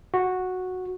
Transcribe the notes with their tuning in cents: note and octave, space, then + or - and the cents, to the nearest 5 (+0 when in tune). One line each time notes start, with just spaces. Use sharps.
F#4 -5